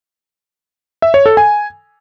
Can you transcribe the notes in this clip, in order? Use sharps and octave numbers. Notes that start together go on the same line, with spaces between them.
E5
C#5
A4
G#5